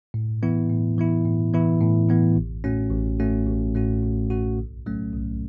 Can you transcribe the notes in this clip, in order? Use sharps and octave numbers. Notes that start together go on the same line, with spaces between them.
A2
E3 B3 E4
A2
E3 B3 E4
A2
E3 B3 E4
A2
E3 B3 E4
A1
A2 A3 C#4 F#4
A1
A2 A3 C#4 F#4
A1
A2 A3 C#4 F#4
A1
A2 A3 C#4 F#4
B1
A2 F#3 A3 C#4
B1